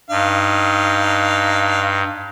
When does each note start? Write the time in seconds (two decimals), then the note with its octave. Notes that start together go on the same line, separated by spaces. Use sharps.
0.11 G2 D#4 F5